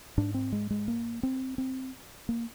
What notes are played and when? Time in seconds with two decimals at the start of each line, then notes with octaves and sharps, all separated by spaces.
0.18 G#2 D4
0.34 C4
0.52 G#3
0.70 G#3
0.88 A#3
1.23 C4
1.58 C4
2.29 A#3